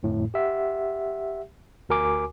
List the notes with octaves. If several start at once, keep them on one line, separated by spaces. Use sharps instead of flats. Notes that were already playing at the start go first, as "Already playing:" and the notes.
G1 F2 A2
G4 E5 F#5
D2 F#4 A#4 G#5 D6